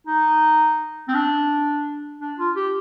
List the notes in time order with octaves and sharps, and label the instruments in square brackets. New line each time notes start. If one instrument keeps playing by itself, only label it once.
[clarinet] D#4
C4
D4
D4
F4
G4